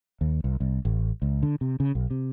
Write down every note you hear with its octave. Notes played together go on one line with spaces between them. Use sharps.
D#2
C2
C2
A1
C#2
D3
C3
C#3
B1
C3